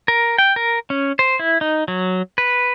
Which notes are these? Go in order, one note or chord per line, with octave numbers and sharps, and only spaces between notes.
A#4
G5
A#4
C#4
C5
E4
D#4
F#3
B4